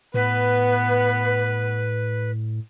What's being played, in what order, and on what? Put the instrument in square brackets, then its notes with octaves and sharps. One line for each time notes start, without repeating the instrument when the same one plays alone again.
[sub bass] A2 [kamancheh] B3 [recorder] B4